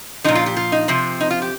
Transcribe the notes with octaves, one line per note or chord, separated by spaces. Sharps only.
A#2 F3 D#4
F4
G4
F4
D#4
C3 F3 C4
D#4
F4
G4